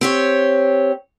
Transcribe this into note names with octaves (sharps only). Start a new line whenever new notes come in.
C4 G4 C#5